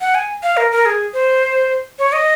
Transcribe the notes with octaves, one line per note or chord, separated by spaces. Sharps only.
F#5
G#5
F5
A#4
A#4
G#4
C5
C#5
D#5